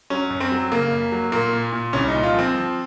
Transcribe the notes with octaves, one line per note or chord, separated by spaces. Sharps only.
F#3 C#4
F#2
C4
F#3
C#3 A#3
F#2
F#3
A#2 A#3
A#2
A#2
C2 C#4
D#4
A#2
F4
F3
C4
F3